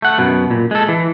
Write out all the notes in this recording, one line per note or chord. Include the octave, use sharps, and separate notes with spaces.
A3 F#5
F#2 B2
A#2
G#3 A4
E3